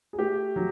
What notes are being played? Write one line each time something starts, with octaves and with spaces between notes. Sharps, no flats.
G#4
A3 G4
F#3